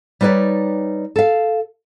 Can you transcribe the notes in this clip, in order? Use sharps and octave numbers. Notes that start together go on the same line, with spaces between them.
G3 D#4 B4 C#5 D5
A4 F5